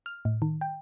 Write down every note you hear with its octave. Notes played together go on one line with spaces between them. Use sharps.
F6
A2
D#3
G5